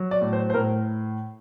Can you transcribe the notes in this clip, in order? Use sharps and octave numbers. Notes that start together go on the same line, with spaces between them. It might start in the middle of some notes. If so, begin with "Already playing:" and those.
Already playing: F#3
D5
A2
C5
C5
A2 A#4